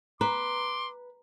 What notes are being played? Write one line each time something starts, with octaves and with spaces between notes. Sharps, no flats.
B4 A#5 C6 D6